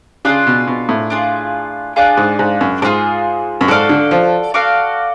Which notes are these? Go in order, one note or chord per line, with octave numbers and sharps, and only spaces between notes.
C#3 D4 F4 G#4
B2
B2
A2
D4 F4 G#4
D4 F4 G#4
G#2
G#2
F#2
G#2 D4 F4 G#4
F#2
G#2 F#4 A4 D5 F5
D3
F3
F#4 A4 D5 F5